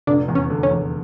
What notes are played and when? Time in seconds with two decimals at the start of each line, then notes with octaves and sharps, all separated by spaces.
0.07 F1 D3 D4
0.28 E2
0.35 C#4
0.50 D3
0.63 C#4
0.71 E2